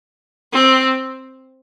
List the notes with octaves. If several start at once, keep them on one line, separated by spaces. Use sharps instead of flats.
C4